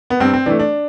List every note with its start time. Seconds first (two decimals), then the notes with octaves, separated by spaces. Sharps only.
0.10 B3
0.20 G2 C4
0.33 C4
0.46 E3 A3 D4
0.60 D4